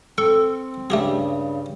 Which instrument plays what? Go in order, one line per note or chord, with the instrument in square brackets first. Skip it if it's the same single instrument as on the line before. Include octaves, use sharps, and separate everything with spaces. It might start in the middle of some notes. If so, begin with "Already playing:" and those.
[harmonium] C4 [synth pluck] A4 [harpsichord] C#6
[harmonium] G2 C#3 G3 [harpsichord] A3 G4 G#4